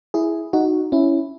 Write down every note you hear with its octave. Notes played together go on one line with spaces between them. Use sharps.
E4 G#4
D#4 F#4
C#4 E4